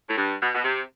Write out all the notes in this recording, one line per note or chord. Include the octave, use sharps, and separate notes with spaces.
A2
G2
B2
B2
C3